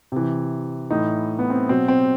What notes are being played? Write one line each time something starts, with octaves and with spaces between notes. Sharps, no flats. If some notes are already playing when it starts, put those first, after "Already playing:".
C3 E3
A2 E3 D#4
B3
C4
B2 F#3 C4
C4